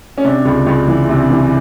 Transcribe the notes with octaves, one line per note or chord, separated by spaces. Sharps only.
C#4
C3 D4
C#2
C#2
E3
C3 D4
E3